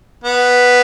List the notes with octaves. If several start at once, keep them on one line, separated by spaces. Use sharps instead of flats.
B3